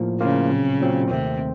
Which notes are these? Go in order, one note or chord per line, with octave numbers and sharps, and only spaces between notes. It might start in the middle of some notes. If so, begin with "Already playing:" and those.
Already playing: A2 F3 A#3 F4
A2 C#3 F3 A#3 F4
A#2 F#3 C4
A#2 F#3 C4
D#2 C3 D#3 A3 C4